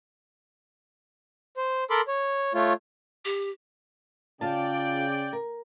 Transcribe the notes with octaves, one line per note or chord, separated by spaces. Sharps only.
C5
A4 A#4 B5 C6 D6
C#5
A3 F4 C#5
G4
C#3 F4 D5 G5 A5
A#4